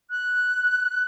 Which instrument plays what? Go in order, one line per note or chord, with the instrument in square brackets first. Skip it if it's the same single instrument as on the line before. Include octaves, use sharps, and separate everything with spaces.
[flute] F#6